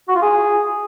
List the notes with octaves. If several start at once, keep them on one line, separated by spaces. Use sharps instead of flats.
F#4
F4
G#4